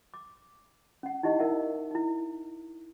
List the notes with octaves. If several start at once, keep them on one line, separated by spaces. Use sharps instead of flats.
D6
C#4 F#5
D#4 E4 G4 D#5
D#4 E4 A#4 D5 E5 F#5
D#4 E4